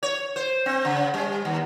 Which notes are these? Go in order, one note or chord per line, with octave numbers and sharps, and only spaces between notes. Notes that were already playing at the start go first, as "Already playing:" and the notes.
C#5
C5
C4
C#3
G3
D#2